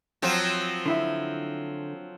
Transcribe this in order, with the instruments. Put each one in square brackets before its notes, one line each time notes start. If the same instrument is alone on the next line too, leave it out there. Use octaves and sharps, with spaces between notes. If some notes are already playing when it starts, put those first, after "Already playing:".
[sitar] F3 F#3 C4
[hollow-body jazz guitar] D3 E4 E5